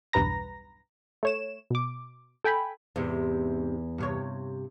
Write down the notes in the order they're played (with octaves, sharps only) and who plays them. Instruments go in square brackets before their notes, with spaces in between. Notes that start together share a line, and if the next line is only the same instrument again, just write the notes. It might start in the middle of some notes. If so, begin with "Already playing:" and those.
[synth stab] B1 E2 G2 B4 A#5 A#6
A3 C#5 E7
B2 D6
A4 G5 G#5 B5
[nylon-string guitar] E2 [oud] G#2 C3
[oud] G2 C3 C#5